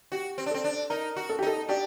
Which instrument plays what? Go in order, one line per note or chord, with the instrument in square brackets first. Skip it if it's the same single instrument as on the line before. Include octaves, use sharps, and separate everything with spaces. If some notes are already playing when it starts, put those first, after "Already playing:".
[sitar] F#4 [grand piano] G4
[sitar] C4
D4
[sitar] C4 [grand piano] A4
[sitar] D4
[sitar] D#4 [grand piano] A#4
[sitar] F#4
[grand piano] A4
G4
[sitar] D#4 [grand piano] A4
[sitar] D4 [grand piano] G4